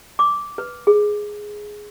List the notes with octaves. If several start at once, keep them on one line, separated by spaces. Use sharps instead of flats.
D6
B4
G#4